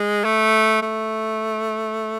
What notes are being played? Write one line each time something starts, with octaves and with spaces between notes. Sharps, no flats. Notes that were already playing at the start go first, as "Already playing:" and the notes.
Already playing: G#3
A3
A3